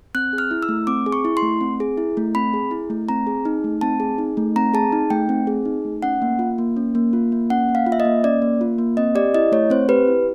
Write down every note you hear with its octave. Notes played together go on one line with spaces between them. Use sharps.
C4 F#6
G#4
F6
E4
E6
A3
C4 D6
G#4
C#6
E4
C6
A3
C4
G#4
E4
A3
C4 B5
G#4
E4
A3
C4 A#5
G#4
D#4
A3
C4 A5
G#4
D#4
A3
C4 A#5
G#4 A5
D#4
A3 G5
C4
G#4
D#4
A3
C#4 F#5
A#3
F4
A#3
C#4
A#3
F4
A#3
C#4 F#5
A#3
F5
F4
E5
D#5
A#3
C#4 D5
A#3
F4
A#3
C4 D#5
G4 D5
E4 D#5
A3 C#5
C4 C5
G4 B4
E4